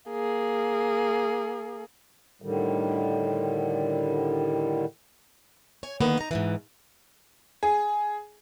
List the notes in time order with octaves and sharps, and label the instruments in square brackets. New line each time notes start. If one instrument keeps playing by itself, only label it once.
[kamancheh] A#3 G#4
[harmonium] A2 D3 D#3 G3
[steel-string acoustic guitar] C#5 G#5
D3 D#3 A#3 B3
D#4 A#5
G#2 B2 E3
[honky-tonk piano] G#4